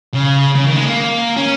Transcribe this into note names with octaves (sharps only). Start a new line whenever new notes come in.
C#3
C#3
D#3
G#3
A#3
C#4